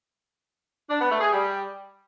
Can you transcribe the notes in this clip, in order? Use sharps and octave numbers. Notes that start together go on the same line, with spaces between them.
D4
B3
A3
G#4
G3